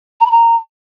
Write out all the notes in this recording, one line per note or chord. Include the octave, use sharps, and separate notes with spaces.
A#5
B5
A#5